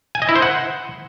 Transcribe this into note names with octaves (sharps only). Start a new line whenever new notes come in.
G#5
D#5
E4
C5
F#5